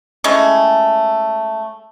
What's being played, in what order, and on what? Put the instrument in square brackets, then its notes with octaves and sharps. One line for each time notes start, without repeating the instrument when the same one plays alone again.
[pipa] G#3 A3 C#4 E4